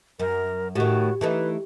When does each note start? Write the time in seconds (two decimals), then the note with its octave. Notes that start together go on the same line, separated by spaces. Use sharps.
0.19 F#2 A#4
0.75 A2 D#3 F#4 G4
1.21 E3 A3 D#4 B4